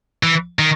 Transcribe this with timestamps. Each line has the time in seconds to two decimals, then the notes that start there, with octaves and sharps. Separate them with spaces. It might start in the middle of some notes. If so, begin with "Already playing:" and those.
0.23 E3
0.59 D#3